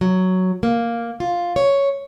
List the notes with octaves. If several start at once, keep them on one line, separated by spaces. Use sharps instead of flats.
F#3
A#3
F4
C#5